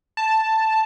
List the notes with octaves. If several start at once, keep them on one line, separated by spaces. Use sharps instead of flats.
A5